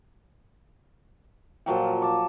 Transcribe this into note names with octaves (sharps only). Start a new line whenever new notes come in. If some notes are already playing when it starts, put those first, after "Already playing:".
A#2 F3 F#3 G5
A5 D6